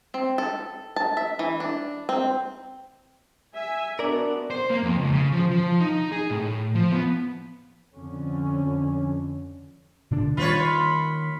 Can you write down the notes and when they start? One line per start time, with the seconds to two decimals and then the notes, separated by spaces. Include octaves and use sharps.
0.14 C4
0.38 A4
0.96 A5
1.17 E5
1.39 E3
1.60 D4
2.09 C4
3.55 E5 G#5
3.99 B3 D4 F#4 A#4 D5
4.50 C5
4.70 A#3
4.83 F2
4.98 C#2
5.13 C#3
5.33 F3
5.51 F3
5.80 D#4
6.12 G#4
6.30 A2
6.75 F3
6.91 B3
7.95 F2 D3 C#4
10.11 A#2 D3 D4
10.37 D#3 G3 A#3 F4 B4 C#5 B5